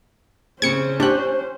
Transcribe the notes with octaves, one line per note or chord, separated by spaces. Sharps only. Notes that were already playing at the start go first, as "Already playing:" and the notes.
C#3 C4 C#4 G#4 C5 G#6 C#7
D4 G4 C#5 G5 F#6